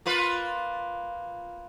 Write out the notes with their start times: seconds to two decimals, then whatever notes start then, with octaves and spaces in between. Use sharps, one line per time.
0.06 A#3 F4 B4